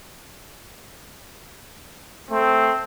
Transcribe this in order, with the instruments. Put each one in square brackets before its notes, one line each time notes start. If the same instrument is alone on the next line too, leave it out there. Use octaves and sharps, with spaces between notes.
[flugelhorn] A3 [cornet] C4